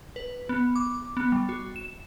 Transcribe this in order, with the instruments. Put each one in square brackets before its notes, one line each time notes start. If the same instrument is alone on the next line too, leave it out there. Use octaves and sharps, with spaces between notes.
[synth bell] B4
B3
D6
B3
G3
F#4
E7